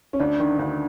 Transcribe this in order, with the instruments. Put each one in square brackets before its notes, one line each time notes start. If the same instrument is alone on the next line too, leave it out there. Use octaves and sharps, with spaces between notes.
[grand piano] C#4
[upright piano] D2 [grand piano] D4
[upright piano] D#3
[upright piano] D2 [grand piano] D4